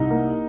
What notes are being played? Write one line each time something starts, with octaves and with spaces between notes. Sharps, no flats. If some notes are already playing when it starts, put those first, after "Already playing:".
Already playing: C2 D#4 D#5
A#3